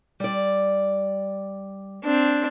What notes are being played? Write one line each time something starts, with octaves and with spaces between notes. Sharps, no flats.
G3 D5
C4 D4